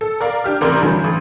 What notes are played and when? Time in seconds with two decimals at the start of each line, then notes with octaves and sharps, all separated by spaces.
0.01 A4
0.20 A#4 D5 F5
0.44 D4 G4 F6
0.61 A1 C3 A#4 D5 C6 G6
0.81 G2 D3 E3 F#3
1.04 A1